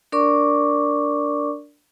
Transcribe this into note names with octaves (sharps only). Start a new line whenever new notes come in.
D4 A#4 D5 C#6 D6